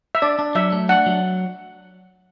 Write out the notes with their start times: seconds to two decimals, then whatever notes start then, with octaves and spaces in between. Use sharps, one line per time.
0.15 E5
0.22 D4 D5
0.39 D4
0.55 F#3 E5
0.72 A3
0.89 D4 F#5
1.06 F#3